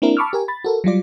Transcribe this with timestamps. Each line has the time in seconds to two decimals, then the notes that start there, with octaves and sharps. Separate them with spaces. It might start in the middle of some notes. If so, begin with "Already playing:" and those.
0.02 A#3 C4 D4 E4 A#4
0.17 A5 B5 C#6 D6 E6 F6
0.33 G4 A#4 G#5
0.48 B5 A6
0.64 F#4 A4 A#4
0.84 F#3 G3 F4 D5